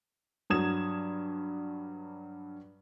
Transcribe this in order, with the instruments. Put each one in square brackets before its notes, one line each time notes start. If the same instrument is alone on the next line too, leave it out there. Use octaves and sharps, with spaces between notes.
[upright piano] G2 F#3 D#6 G#6 E7